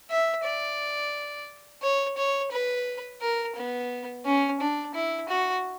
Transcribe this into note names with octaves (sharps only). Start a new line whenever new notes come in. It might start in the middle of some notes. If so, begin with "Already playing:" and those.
E5
D5
C#5
C#5
B4
A#4
B3
C#4
D4
E4
F#4